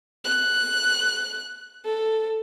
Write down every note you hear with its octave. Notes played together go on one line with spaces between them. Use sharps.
F#6
A4